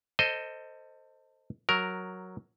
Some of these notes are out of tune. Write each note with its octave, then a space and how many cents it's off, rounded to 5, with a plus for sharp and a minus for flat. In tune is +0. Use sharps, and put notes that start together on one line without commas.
A4 +30 C5 +0 D#5 +0
F#3 +0 A#4 +0